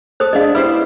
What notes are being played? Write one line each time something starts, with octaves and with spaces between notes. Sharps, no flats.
A4 C5 D#6
G#3 D4 D#5 F5
E4 G4 B4 C5